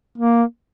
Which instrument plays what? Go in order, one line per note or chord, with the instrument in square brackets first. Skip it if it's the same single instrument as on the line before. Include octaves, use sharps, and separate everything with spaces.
[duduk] A#3